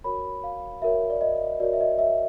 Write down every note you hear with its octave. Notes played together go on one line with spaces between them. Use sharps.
F#4 A#4 C#5 B5
F5
F#4 A#4 C#5 E5
D5
D#5
F#4 A#4 C#5 D5
E5
D#5
E5